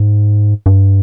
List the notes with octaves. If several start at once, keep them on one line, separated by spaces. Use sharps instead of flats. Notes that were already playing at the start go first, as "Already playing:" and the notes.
Already playing: G#2
G2